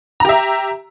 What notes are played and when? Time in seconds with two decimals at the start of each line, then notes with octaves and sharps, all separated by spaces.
0.20 A#5
0.25 G4
0.29 E5